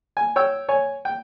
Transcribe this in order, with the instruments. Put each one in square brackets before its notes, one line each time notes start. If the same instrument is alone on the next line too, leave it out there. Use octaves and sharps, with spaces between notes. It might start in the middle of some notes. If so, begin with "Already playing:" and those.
[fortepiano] G#5
C#5 G5 E6
C#5 G#5
G5